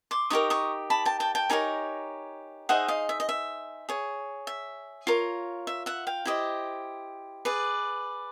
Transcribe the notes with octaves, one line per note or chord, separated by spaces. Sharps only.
C6 D6
D#4 G4 A#4 C#6 D#6
C#6 D#6
A5 B5
G5 A5
G5 A5
G5 A5
D#4 G4 A#4 C#5 G#5 A#5
D#4 G#4 C5 D#5 E5 F#5
D#5 F5
E5
D#5
E5
G#4 C#5
E5
F4 A#4 C#5
E5
E5 F#5
F5 G5
E4 G4 C5 D#5
G#4 B4 D5